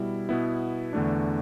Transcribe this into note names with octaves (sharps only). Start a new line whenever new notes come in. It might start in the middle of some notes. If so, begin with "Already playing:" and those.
Already playing: B2 G3 E4
B2 B3 E4
E2 D3 A3 D4